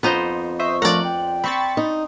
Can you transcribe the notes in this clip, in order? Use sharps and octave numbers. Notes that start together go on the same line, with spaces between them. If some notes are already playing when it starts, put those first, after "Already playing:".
F2 B3 D#4 C5
C5 D#5 E5 C#6
F3 A3 A#4 D5 F#5
C4 G5
C4 B5 C#6 A6
D#4